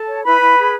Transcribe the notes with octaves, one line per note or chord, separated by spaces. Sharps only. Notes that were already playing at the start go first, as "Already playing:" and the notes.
Already playing: A4 A5
C#5
E4 B4 B5
E4
G#4